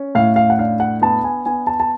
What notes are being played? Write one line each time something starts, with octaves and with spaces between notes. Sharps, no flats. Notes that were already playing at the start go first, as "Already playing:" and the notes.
Already playing: C#4
A2 F5
F5
F#5
D4 F5
F#5
B3 A5
G#5
B3 G#5
A5
A5